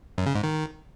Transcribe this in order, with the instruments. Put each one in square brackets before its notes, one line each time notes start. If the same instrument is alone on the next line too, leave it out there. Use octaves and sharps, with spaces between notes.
[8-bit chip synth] F#2
C#3
G#2
D#3